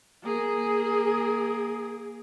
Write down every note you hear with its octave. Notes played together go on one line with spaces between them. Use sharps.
A#3 G#4